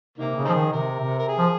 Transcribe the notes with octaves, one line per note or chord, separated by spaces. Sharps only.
C3 D#3 A#3
C#3
F3 C4 D#4 G#4
D#3
C3 A#4
C3
A#4
G#4
F3